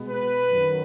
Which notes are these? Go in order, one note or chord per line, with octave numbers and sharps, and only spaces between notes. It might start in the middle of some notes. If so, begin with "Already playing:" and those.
Already playing: B2 G#3 B3
B4
F#2 D#3 F#3